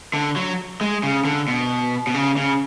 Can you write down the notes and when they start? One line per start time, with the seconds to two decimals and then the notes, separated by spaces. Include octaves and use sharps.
0.14 D3
0.36 F#3
0.81 G#3
1.03 C#3
1.25 D3
1.48 B2
2.07 B2
2.14 C#3
2.37 C#3